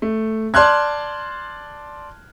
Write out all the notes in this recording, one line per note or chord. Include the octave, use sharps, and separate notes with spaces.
A3
D5 A5 C6 F6 F#6 G#6